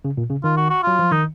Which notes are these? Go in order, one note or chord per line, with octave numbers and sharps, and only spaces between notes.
C#3
A#2
C#3
D#3 F4
F#4
F#4
F#3 F4
F3
D#3 D#4